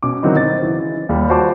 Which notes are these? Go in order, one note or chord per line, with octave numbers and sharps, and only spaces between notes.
B2 C#4 D6
D3 D#3 F#3 C4 D#4 E4
D#4 C5 A6
C#3 E3
D#2 G3
F4 F#4 C5 C#5 A5 D6